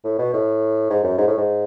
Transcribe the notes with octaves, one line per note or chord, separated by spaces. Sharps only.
A2
B2
A2
G#2
F#2
G#2
A2
G#2